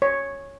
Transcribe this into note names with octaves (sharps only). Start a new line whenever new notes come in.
C#5